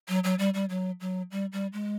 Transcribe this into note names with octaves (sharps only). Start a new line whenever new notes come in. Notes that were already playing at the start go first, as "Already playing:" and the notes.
F#3
F#3
G3
G3
F#3
F#3
G3
G3
G#3